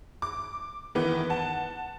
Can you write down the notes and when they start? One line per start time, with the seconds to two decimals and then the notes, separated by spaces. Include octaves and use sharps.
0.22 D6
0.95 D#3 E3 B3
1.30 F#5 A5